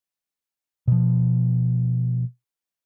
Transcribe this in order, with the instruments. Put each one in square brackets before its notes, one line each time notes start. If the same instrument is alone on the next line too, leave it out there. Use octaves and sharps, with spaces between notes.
[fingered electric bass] B2 F3